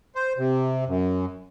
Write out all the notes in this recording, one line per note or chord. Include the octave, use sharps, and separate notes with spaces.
C5
C3
F#2